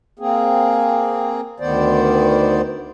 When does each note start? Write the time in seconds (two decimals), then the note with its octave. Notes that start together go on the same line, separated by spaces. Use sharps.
0.19 A#3 C4 G#4
1.60 D2 D#3 B3 C5 D5